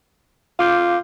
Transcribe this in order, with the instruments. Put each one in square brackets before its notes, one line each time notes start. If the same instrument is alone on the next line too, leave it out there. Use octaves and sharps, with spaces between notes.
[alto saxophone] F4 [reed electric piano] F5 D6 G6